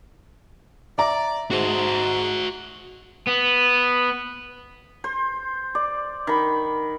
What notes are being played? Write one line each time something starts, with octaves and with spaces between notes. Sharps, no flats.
D5 E5 A#5
G#2 F#4 C5
B3
C5
D5
D#3 B5